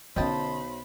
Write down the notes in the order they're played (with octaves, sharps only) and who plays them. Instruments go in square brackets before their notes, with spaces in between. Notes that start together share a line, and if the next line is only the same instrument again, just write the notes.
[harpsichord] B1 [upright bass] D3 C#4 [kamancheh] C5 B5 [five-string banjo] D#5 G5 A5